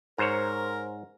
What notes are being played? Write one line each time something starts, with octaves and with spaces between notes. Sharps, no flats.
G#2 A#4 C5 C#5